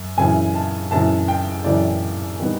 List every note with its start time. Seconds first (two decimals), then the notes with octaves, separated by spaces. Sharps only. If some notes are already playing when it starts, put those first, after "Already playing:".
Already playing: F#2
0.18 F#2 C#3 E3 G#5
0.55 A5
0.91 F#2 C#3 E3 A5
1.28 G5
1.64 F#2 C#3 E3 D5
2.40 D#3 G3 B3